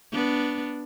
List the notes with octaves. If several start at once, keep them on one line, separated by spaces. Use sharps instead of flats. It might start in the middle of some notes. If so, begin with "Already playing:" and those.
B3 D4